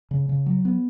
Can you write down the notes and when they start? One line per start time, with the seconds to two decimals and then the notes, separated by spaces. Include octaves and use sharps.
0.11 C#3
0.29 C#3
0.46 F#3
0.65 B3